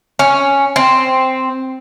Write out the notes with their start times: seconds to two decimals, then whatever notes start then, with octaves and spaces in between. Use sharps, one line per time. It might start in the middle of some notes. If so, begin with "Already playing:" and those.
0.19 C#4
0.76 C4